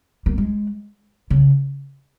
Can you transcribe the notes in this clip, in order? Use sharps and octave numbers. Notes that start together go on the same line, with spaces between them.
A#3
G#3
C#3